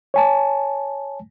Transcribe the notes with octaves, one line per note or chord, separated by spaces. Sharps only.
C#5 G#5 A5